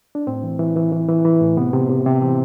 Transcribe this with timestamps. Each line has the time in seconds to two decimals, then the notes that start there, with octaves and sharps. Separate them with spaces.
0.15 D4
0.27 A2 C4
0.43 E3
0.59 E3
0.76 E3
0.92 E3
1.08 E3
1.25 E3
1.41 A2
1.57 C3 B3
1.73 C3
1.89 C3
2.06 C3
2.22 E3